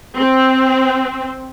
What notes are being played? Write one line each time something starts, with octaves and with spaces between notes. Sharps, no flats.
C4